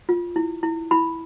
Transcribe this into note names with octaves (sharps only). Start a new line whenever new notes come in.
F4
E4
E4
E4 B5